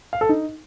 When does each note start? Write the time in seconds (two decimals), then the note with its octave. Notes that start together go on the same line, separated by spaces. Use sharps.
0.13 F5
0.21 A4
0.29 D#4